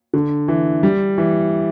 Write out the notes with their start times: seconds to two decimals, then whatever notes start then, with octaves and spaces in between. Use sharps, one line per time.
0.14 D3
0.48 E3
0.83 G3
1.18 E3